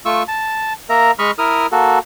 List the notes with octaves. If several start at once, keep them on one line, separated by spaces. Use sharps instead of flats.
A3 F4 C#6 E6
A5
A#3 A#4 E5 A#5
G#3 D#5 B5 C#6 F6
E4 A#4 D#6 F6
A#3 F#4 A4